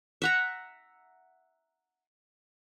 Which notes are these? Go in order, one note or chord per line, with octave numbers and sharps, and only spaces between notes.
E5 F#5 A#5